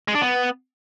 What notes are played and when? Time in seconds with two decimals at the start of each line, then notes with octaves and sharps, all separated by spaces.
0.08 G#3
0.15 D4
0.22 B3